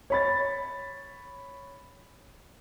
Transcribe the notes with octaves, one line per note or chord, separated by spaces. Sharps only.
C#5 B5 A6